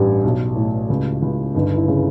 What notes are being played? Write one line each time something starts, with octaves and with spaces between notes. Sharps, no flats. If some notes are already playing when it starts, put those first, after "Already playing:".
Already playing: A1 G2 G4
B1
A2
C#2
C#2
G1 D#4
E4
C#3